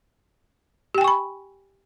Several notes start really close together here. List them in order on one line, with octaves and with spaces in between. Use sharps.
G4 G5 G#5 C#6 B5